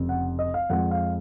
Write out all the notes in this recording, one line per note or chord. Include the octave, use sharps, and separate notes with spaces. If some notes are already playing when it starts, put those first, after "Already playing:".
Already playing: F1 F2 C#3
F#5
D#5
F5
F2 F3 G#3 F#5
F5